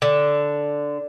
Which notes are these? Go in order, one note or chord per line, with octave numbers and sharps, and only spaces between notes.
D3